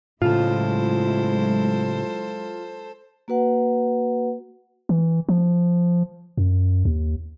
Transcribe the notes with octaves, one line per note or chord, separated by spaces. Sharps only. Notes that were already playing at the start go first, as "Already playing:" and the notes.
A2 C#3 F#3 G#3 E4 F4 A4 C5
A#3 F#4 B4 F#5
E3
F3
F#2
D#2